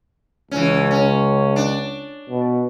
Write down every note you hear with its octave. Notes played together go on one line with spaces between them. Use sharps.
C#2 E3 C#4
C#4
D4
B2